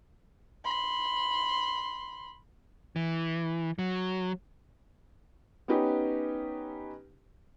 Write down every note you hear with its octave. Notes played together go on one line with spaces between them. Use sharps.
B5 C6
E3
F#3
B3 C#4 D#4 G4 B4